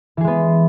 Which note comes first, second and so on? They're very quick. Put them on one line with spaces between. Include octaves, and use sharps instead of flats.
E3 G#4 G#3 B3